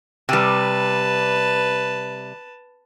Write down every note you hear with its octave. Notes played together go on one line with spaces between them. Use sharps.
C3 G3 B4 A5